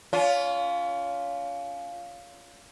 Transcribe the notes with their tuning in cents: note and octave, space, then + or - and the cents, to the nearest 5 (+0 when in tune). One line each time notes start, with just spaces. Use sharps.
C#4 +35 F4 +0